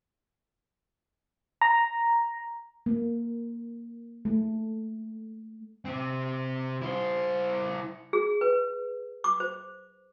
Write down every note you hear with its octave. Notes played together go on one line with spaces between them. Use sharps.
A#5
A#3
A3
C3 C4
E4 C5
G#4
B4
D6
C5